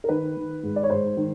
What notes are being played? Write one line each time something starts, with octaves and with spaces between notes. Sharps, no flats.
A#4
D#3 B4
D#3
G#2
D5
C#5
G#2 C5
D#3